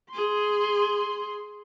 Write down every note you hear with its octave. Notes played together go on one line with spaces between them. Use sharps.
G#4 C6